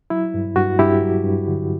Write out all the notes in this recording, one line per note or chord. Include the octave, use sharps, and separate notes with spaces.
F#3 E4
G2
G2 F#4
G2 E4 G4
F#3
G2
D3